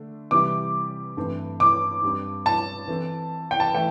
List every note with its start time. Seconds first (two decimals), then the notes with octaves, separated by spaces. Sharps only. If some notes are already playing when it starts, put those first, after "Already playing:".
Already playing: D3 A3 D4
0.31 C3 E3 G3 E4 G4 D6
1.17 G2 E3 A3 C4
1.60 D6
2.03 G2 G3 C4
2.46 A5
2.88 E3 C4 A4
3.51 G5
3.60 A5
3.74 E3 A3 E4 G5